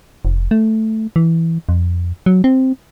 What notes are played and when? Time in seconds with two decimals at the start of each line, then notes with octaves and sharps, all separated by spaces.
0.25 F1
0.51 A3
1.16 E3
1.69 F2
2.26 F#3
2.44 C4